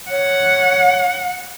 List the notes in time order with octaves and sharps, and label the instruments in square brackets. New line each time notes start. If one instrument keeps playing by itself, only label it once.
[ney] C#5 [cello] F#5